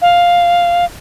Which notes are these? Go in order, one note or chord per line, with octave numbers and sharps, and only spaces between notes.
F5